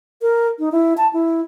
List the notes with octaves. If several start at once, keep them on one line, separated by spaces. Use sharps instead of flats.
A#4
D#4
E4
A5
E4